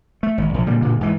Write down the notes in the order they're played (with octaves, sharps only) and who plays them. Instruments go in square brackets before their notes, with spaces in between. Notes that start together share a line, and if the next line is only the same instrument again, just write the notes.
[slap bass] A3
G#1
A#1
A#2 D3 G3
G2 A#2 D3
D2 G#2 E3